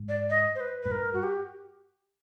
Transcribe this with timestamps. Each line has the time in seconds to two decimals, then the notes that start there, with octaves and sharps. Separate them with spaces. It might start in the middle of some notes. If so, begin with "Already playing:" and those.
Already playing: G#2
0.09 D5
0.30 D#5
0.55 C5
0.60 B4
0.83 G#2 B4
0.90 G2 A#4
1.13 F#4
1.23 G4